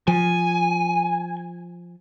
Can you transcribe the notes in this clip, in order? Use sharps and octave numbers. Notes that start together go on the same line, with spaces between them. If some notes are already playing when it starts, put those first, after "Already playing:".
F3 G#5